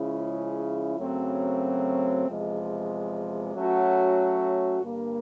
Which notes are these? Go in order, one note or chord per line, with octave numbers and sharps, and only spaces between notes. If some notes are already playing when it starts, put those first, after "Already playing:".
Already playing: C#3 F3 G#3 C#4 E4
F#2 C#3 F#3 A3 C4
E2 C3 F3 G#3
F#3 A3 C#4 F#4
G2 D3 G3 A#3